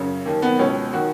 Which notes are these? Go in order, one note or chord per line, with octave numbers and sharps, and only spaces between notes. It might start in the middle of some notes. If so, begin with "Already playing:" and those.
Already playing: F#2 C#3 C#4
D#2 D#3
B3
C#2 B2 C#4
D#3 F#4